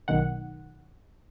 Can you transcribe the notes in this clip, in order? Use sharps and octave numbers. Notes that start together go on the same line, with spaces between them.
B1 D#3 F#5